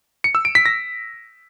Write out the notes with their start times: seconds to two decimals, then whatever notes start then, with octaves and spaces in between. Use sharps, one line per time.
0.24 C#7
0.35 E6
0.45 D7
0.55 B6
0.66 A#6